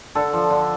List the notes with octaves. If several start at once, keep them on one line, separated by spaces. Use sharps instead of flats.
D3 A4
F3
D3